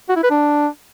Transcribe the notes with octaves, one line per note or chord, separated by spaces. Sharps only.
F#4
E4
B4
D4